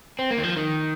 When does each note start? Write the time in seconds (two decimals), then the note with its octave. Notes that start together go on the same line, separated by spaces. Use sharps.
0.19 C4
0.31 A#3
0.38 D#3
0.43 F3
0.57 D#3